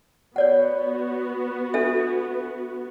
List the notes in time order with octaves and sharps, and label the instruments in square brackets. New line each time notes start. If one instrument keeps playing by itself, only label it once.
[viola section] B3 F#4 [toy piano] C#5 D5 F#5
[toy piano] D4 A4 E5